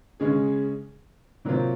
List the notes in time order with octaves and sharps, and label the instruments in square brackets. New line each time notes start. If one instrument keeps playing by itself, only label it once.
[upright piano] C#3 G#3 C#4 G#4
C3 F#3 A#3 F4 C5